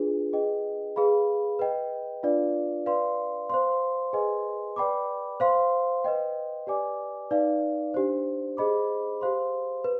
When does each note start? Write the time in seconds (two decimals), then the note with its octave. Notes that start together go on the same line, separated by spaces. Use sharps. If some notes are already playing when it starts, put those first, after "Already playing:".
Already playing: D4 F4 G#4 B4
0.33 G#4 B4 D#5 G5
0.96 G#4 B4 F5 B5
1.59 B4 D#5 G5
2.23 D4 F4 B4 D5 F5
2.86 B4 D5 F5 C6
3.50 C5 F5 C6
4.13 G#4 B4 D#5 G#5 C6
4.76 B4 D5 G5 B5 D6
5.40 C5 F5 C6
6.04 B4 D#5 G5
6.67 G4 B4 D5 G#5 D6
7.31 D#4 B4 D5 F5
7.94 D4 G4 C5
8.57 G#4 C5 D#5 B5 D6
9.21 G4 C5 F5 C6
9.84 B4